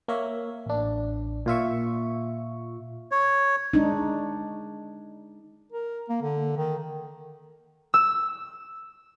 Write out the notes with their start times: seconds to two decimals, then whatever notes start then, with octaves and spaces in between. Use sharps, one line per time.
0.08 A#3 A#4 C#5 E5
0.66 A1 D4
1.46 A#2 F4 E5 C#6
3.11 C#5
3.74 G#3 D4 D#4
5.72 A#4
6.09 A#3
6.22 D3
6.58 D#3
7.94 E6